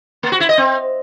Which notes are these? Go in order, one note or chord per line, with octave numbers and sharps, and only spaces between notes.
A#3
F#4
E4
D#5
C4